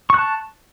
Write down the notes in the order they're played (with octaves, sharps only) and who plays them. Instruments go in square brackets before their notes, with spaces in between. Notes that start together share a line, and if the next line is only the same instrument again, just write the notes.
[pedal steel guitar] C#6
F#6
A5